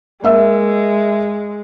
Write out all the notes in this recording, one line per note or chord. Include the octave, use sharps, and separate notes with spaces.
G#3 A#3 E5 E6